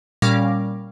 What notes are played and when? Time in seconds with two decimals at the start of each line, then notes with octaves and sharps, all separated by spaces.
0.22 A#2 G3 C#4 F5 D6 A#6